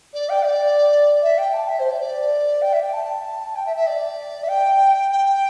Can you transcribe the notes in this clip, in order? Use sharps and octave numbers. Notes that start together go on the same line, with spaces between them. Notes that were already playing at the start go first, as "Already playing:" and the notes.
D5
G5
D5
E5
G5
A5
E5
C5
D5
D5
G5
E5
G5
A5
G5
E5
E5
D5
E5
G5
G5